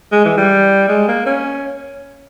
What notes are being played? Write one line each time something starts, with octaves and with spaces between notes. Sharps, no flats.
G#3
E3
G3
G#3
A#3
C#4